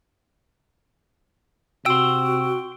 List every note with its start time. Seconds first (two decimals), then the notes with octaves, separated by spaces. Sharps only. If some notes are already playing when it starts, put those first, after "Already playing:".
1.86 C3 F#4 G5 C6 E6